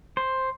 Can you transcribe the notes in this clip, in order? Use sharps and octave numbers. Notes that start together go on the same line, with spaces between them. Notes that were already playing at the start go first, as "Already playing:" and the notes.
C5